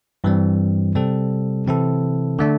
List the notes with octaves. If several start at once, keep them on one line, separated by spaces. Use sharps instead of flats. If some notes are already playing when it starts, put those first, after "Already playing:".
G2 E3 G3 C4
C3 G3 C4 A4
C3 E3 C4 E4 A4
D3 A3 D4